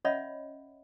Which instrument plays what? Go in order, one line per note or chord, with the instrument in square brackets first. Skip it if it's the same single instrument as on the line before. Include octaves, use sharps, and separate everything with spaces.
[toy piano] C#4 C#5 D#5 E5 F#5 B5